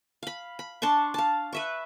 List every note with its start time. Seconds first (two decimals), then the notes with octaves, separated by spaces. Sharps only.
0.23 F5 B5
0.59 B5
0.82 D4 A5 C6 C#6
1.14 F5 A5
1.53 B4 E5 C#6